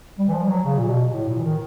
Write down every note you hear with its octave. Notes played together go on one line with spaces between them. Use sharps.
G3
E3
F3
G3
F#3
C#3
A#2
B2
A2
A#2
E3
D#3